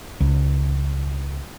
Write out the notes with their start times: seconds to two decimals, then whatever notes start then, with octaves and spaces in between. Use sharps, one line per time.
0.20 C#2